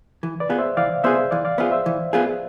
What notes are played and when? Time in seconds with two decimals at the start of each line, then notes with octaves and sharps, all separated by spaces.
0.23 E3
0.40 B4 D5
0.49 B3 F4 G#4
0.58 C5 E5
0.77 E3 D5 F5
1.04 B3 F4 G#4 C5 E5
1.31 E3 D5 F5
1.45 D5 F5
1.58 B3 F4 G#4 C5 E5
1.72 C5 E5
1.86 E3
2.13 B3 F4 G#4